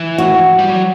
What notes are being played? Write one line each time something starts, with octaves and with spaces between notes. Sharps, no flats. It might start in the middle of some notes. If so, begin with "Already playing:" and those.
Already playing: E3
F#4
G3
F#3